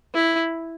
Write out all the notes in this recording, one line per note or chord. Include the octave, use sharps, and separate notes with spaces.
E4